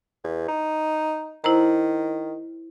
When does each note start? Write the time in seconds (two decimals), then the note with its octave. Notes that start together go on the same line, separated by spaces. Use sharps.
0.24 E2
0.48 D#4
1.44 D#3 E4 C5 A#5